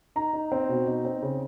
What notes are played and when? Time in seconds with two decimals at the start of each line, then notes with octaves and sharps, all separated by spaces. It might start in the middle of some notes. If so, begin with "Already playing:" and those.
0.16 D#4 A#5
0.33 D#4
0.52 C4
0.69 B2
0.87 D#4
1.05 C4
1.22 C#3